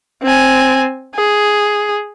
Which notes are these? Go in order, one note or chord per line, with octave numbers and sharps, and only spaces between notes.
C4 G#5
G#4